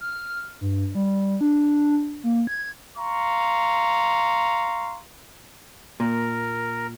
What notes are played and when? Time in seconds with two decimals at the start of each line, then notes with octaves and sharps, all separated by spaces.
0.01 F6
0.61 G2
0.95 G3
1.41 D4
2.24 A#3
2.47 G#6
2.98 F5 A#5 C6 C#6
6.00 A#2 A#4